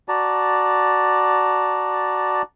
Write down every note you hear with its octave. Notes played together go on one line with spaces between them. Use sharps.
F#4 D5 A5 A#5